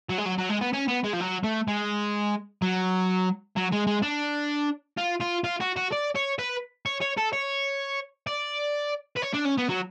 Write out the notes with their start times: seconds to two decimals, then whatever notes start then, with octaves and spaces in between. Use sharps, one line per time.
0.10 F#3
0.18 G#3
0.26 F#3
0.38 F#3
0.49 G#3
0.61 B3
0.73 C#4
0.88 B3
1.04 G#3
1.13 F3
1.21 F#3
1.44 A3
1.68 G#3
2.62 F#3
3.56 F#3
3.72 G#3
3.87 G#3
4.02 D4
4.98 F4
5.21 F4
5.44 F4
5.60 F#4
5.76 F#4
5.92 D5
6.16 C#5
6.39 B4
6.86 C#5
7.01 C#5
7.18 A4
7.33 C#5
8.27 D5
9.16 B4
9.22 C#5
9.33 D4
9.45 C#4
9.57 B3
9.69 F#3